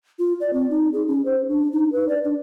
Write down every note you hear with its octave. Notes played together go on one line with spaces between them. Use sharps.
F4
D5
C4
D#4
G#4
C#4
C5
D4
D#4
B4
D5
D4